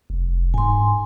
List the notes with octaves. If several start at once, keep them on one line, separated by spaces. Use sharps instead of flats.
F1
G#2 G#5 C6